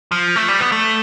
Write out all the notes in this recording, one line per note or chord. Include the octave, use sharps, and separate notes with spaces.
F3
A3
G3
B3
A3